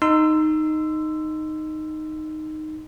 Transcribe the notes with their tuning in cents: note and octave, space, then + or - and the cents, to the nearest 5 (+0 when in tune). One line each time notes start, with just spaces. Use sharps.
D#4 -5 C6 -20 E6 +15